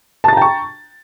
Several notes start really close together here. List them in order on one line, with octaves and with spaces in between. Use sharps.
A5 A6 A#5 G5 C#6